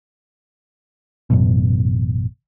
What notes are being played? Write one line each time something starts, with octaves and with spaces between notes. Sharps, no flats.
A1 F#2 B2